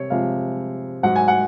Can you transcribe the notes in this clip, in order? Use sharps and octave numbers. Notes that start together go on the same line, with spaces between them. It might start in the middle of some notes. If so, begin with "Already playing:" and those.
Already playing: C3 C#5
C3 F3 G#3 F5
G#2 F#3 F#5
G#5
F#5